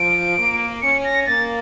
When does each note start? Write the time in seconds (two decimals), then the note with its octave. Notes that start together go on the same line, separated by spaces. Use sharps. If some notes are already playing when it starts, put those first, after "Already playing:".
Already playing: F3 D7
0.38 A#3
0.82 C#4 C#7
1.05 A#6
1.27 A#3 A6